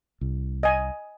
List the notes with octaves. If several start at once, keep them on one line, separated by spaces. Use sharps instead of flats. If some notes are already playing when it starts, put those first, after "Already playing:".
C2
D#5 G#5